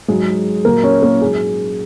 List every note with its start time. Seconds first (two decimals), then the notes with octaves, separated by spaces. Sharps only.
0.08 G#2 F#3 G#3 G#4
0.65 A#2 F#3 A#3 A#4
0.84 C#4 C#5
1.03 A#3 A#4
1.21 G#2 F#3 G#3 G#4